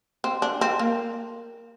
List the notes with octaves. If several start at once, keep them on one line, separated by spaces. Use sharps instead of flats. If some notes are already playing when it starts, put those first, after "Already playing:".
C4
D4
C4
A#3